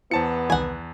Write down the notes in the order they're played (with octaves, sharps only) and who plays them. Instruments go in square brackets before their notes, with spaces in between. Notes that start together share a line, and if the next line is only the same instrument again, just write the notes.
[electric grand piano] E2 A5 C#7 [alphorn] B3 [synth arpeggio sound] E4 C5
[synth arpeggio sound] C2 D#3 E3 [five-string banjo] F#5 G#5